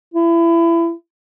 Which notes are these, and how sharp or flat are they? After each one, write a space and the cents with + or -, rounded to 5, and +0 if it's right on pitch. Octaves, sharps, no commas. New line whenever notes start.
E4 +25